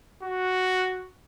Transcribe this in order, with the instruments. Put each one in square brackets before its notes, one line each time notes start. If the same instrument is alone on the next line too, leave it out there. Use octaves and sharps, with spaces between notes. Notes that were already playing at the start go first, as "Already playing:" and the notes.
[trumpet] F#4